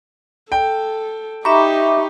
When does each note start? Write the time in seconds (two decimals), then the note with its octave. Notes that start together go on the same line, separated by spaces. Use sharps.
0.52 A4 G5
1.45 D#4 G4 E5 A#5 B5 C#6 D6